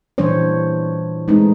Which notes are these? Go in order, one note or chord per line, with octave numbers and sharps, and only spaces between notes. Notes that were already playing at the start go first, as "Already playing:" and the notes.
A#2 E3 G3 D4 C5 C#5
G#3 A3 C4 D#4 B4